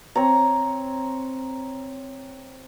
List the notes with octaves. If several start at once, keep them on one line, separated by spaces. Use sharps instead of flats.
C4 C#5 A#5